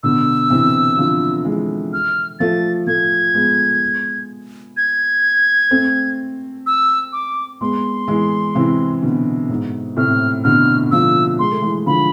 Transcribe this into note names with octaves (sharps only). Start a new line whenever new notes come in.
B2 D3 E6
C3 E3
D3 F3
E3 G#3
F6
F3 A3 A6
F3 A3 G#6
G#3 B3
G#6
A3 C4
E6
D6
G#3 B3 C6
E3 G#3
C3 E3
B2 D3
G#2 B2
A2 C3 F6
B2 D3 F6
D3 F3 E6
G#3 C6
A3
E3 G#3
D3 F3 B5